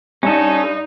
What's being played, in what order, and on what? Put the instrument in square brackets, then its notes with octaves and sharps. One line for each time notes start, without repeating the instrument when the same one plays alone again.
[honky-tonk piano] G2 [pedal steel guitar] C#4 A4 [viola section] D#4